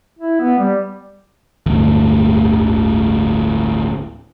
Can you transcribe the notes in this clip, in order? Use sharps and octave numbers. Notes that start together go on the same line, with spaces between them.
E4
B3
G3
D1 G1 D2